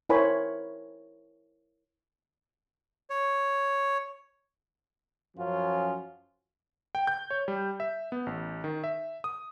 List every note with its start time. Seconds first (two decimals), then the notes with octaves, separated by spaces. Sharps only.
0.09 E4 A#4 C5 C#5 G#5 B5
3.10 C#5
5.37 F#2 F3 F#3 C#4 F4
6.95 G5
7.07 G6
7.30 C#5
7.48 G3
7.80 E5
8.12 B3
8.26 A1
8.64 D#3
8.84 E5
9.24 D#6